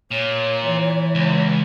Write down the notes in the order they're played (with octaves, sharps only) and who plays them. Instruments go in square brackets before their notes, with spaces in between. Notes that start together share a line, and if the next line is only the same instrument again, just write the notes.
[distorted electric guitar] A#2 [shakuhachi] C#5
[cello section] E3
[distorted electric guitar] C#2